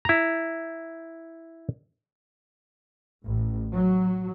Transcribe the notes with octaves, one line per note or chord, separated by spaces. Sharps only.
E4 A#5
A1
F#3